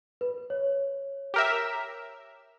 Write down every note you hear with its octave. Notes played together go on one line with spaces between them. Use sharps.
B4
C#5
G4 A#4 E5